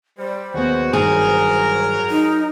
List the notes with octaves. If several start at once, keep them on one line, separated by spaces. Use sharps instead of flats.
G3 C5
D#2 F#3 G#3 B3 F#4
G2 D#3 F#3 G#3 G#4 A#4
D#4